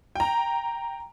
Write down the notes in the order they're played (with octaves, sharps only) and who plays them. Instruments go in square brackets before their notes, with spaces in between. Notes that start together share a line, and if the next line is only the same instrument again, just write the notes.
[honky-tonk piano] G5 A#5